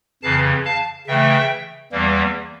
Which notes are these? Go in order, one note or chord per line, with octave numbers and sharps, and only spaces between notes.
F2 C#3 E3 F5 A5
F5 A5
C#3 E3 A3 E5 G5
E2 E3 G3 A#3